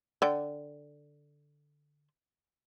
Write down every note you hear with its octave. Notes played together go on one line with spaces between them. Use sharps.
D3 G5